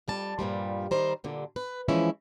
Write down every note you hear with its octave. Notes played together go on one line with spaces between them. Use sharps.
F2 G3 A5
G2 A#2 F3 G3
D#3 G3 C5 A#5
G2 A#2 D3
B4
E3 F3 G#3 C#4 E4